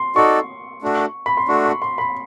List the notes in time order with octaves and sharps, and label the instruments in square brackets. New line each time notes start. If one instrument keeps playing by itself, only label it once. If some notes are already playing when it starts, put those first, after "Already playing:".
Already playing: [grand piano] C6
[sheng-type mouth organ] D#4 F#4 A4 D5 [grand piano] C#6
[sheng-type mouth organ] A3 D4 F#4
[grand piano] B5
C6
[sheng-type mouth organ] A3 D4 F#4 [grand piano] C#6
[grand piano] C#6
C6
B5